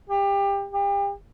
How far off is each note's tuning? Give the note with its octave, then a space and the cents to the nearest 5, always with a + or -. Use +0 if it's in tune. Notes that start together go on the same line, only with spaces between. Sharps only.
G4 +25
G4 +35